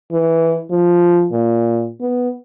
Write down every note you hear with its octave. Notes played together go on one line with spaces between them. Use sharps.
E3
F3
A#2
B3